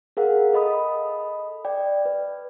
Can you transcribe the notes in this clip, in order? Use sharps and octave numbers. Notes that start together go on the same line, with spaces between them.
G#4 A#4 F5 F#5
A4 D#5 B5 D#6
D5 G5
B4